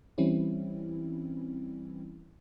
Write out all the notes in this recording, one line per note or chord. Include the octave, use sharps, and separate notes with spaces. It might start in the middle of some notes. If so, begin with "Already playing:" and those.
E3 G3 C4 C#4 E4